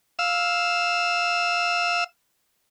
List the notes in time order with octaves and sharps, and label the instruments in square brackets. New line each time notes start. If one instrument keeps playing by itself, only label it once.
[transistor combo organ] F5 E6